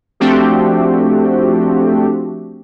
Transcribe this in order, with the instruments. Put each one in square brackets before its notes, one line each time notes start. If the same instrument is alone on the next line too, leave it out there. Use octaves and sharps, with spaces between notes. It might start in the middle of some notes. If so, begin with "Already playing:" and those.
[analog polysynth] F3 A3 C4 D4 F#4 G4